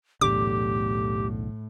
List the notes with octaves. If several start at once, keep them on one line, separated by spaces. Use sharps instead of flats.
B1 E2 A2 D3 G4 D6